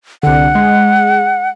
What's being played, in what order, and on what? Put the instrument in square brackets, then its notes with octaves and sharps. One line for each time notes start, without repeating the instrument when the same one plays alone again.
[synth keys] C2 D3 [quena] F#5
[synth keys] G#3